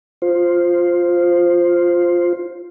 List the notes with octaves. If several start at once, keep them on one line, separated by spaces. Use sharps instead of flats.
F4 C5